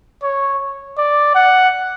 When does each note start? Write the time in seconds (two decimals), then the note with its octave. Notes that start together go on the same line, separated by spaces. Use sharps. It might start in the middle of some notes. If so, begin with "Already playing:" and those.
0.23 C#5
0.98 D5
1.35 F#5